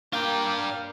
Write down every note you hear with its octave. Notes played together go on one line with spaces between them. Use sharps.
A#3 D4 F5 G5